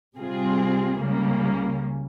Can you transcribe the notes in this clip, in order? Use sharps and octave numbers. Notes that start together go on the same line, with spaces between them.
C3 G3 C4 F4 G#4
C#2 C#3 G3 A#3